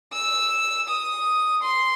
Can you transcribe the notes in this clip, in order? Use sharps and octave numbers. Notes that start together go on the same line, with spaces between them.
E6
D#6
C6